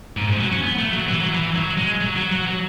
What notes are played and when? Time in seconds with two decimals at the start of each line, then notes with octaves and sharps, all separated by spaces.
0.17 G#2
0.28 G#2
0.40 F#3
0.51 C#4
0.63 B3
0.78 A3
0.93 F#3
1.08 E3
1.21 F#3
1.34 E3
1.55 F#3
1.77 G#3
2.01 F#3
2.16 F#3
2.31 F#3
2.47 F#3